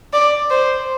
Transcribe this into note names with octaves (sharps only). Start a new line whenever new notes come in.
D5
C5